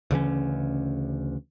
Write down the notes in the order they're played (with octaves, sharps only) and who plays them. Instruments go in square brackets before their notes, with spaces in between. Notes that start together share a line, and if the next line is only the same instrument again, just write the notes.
[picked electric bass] D2 C#3 E3 C#4